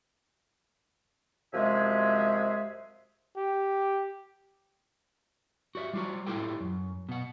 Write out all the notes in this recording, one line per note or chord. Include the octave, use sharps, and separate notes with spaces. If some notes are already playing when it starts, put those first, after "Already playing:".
F#2 C3 F3 G#3 G#4 E5
G4
F#4 G4 D5 E5
G3 F4 F#4
A2 E4 F4 G4 A4 G5
F#2
B2 F#5